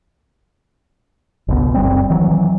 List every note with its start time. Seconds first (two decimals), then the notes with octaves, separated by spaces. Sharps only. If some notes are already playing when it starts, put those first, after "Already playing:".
1.48 G1 C#2 B2
1.74 F#1 G3 C4
2.10 D#3 E3 F#3